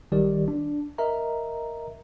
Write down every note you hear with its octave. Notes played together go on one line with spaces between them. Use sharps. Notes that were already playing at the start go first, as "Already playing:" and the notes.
A1 D#3 G3 G4 D5
D4
A#4 D#5 E5 A#5